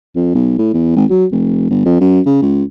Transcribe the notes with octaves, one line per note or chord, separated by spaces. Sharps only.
F2
B1
A2
E2
G#1
F#3
F1
G1
F2
F#2
C#3
C#2